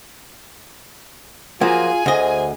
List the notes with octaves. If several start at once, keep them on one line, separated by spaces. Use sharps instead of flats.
F3 F#3 A#3 F4 G#4 G#5
D2 C5 D#5